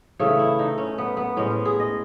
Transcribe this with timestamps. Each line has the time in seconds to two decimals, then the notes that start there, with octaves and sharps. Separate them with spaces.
0.20 C#3 E3 A3 C#5
0.39 E4
0.59 D#4
0.78 C#4
0.98 B3
1.17 B3
1.36 A2 G#3 C#4
1.51 C#4
1.65 G#4
1.79 D#5